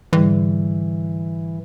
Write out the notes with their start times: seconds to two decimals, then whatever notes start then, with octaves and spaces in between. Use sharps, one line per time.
0.13 G#2 D3 E3 G3